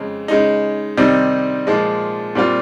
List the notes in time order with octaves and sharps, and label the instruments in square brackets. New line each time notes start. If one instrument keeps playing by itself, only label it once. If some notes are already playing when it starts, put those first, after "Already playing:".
Already playing: [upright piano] F2 C#3 G#3
C#3 G#3 D#4
C3 D#3 G3 C4 D#4
A#2 F3 G#3
A#2 G3 C4 F4